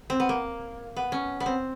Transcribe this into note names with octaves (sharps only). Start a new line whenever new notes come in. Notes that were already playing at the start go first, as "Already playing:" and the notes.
C4
B3
A#3
B3
C#4
B3
C4